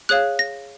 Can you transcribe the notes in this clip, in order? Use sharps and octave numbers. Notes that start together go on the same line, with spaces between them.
G#4 C#5 F5 F#6
A#6